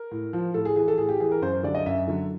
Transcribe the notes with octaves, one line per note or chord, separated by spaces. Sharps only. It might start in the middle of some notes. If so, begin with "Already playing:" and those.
Already playing: A#4
A2
F3
A2 A4
G#4
E3 G#4
A4
A2 G#4
G4
E3 G#4
A#4
F#2 C5
D3 F#3 D5
D#5
F#2 E5
D3 F#3